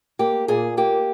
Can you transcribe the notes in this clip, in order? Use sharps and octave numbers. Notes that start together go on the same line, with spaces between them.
A#3 G4
A#2 G#4
A#3 G4